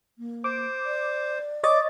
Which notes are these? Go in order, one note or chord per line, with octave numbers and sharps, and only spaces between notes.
A#3
C5 D6
D5
C#5 D#5 D6 A6